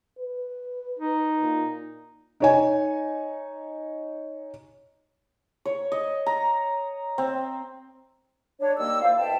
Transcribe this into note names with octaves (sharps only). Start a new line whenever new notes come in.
B4
D#4
A#2
D#4 C#5 G#5
C#5
D#5
A#5
C4
D4 C#5
D#3 G3 A#3 E6
E4 F4 C5 D5 F5
C2 B2 E5 G5 A5